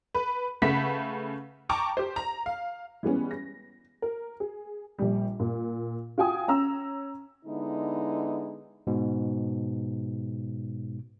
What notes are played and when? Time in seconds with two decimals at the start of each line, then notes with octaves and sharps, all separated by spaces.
0.15 B4
0.62 C#3 A3 B4 F#5 B6
1.69 G5 A5 A#5 C#6 D6
1.97 G4 C5
2.16 A#5
2.46 F5
3.03 E3 G3 G#3 B3 C#4
3.31 A#6
4.02 A#4
4.40 G#4
4.99 A#1 G3
5.40 A#2
6.18 F4 F#4 G5 G#5 D#6
6.48 C#4 A#5 E6
7.45 D3 G#3 B3 D#4 E4
8.87 G#2 B2